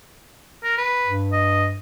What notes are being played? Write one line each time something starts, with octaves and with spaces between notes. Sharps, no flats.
A#4
B4
G2
D#5